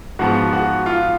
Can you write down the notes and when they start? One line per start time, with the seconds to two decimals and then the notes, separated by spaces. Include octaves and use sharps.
0.19 G#2 F3 B3 F#4
0.53 F#4
0.86 F4